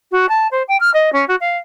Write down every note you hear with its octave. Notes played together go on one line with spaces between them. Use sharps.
F#4
A5
C5
G5
F6
D#5
C#4
F#4
F5